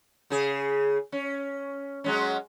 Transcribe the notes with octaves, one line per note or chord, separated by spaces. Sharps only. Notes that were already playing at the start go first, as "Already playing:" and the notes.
C#3 G#4
C#4
F#3 G#3 C#4